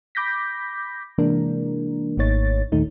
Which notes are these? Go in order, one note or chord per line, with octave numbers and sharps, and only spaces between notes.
B5 D6 G6 A#6 B6
C3 E3 G#3 A#3 D4 A#4
G#1 A3 A#3 D#4 C#5 A6
D#2 A#2 D#3 A3 D#4